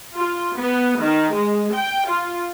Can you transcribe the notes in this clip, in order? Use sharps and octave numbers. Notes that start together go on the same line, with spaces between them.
F4
B3
D#3
G#3
G5
F4